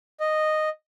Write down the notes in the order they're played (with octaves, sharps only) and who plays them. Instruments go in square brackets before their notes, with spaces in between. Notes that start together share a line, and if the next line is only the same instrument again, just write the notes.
[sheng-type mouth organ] D#5